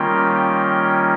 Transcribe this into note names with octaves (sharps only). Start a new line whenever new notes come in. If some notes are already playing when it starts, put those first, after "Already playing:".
Already playing: D#3 G3 A#3 C#4 F4 G5
G5